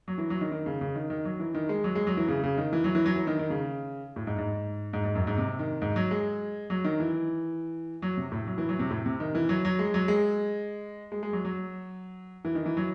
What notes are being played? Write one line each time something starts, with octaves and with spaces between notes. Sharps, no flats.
F#3
E3
F#3
D#3
D#3
C#3
C#3
D#3
D#3
F#3
E3
D#3
G#3
F#3
G#3
F#3
E3
C#3
C#3
D#3
E3
F#3
E3
F#3
E3
D#3
D#3
C#3
A2
G#2
G#2
G#2
G#2
F#2
G#2
C3
D#3
G#2
F#3
G#3
F#3
D#3
E3
F#3
C3
A2
F#3
E3
F#3
C3
A2
C3
D#3
E3
F#3
F#3
G#3
F#3
G#3
G#3
G#3
F#3
F#3
E3
D#3
E3
F#3